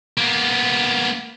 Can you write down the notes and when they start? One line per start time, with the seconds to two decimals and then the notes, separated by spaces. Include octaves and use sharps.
0.18 A#3 B3